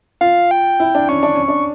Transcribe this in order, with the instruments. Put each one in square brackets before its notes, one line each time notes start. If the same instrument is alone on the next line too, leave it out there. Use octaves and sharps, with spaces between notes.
[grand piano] F4 [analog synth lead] F5
[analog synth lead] G5
[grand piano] E4
D4
[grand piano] C#4 [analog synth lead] C#6
[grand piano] D4
C#4
D4